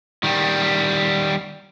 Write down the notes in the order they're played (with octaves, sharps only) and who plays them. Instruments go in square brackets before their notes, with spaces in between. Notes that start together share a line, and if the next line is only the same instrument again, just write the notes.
[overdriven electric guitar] D#3 G3